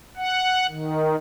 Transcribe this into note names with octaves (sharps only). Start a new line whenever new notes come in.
F#5
D#3